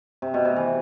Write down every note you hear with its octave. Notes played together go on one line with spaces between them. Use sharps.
C3
B2
C3
E3